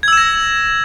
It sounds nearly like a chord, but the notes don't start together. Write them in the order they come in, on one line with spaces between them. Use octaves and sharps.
G#6 E6 E7 A#6